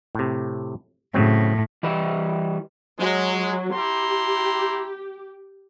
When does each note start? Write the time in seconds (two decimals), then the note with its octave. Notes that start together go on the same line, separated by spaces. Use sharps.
0.15 A2 C3
1.14 A2 C#3 F#3 C4
1.83 E3 G3 B4 D#5 E5
2.99 F#3 G#3
3.74 E4 G4 A#5 C6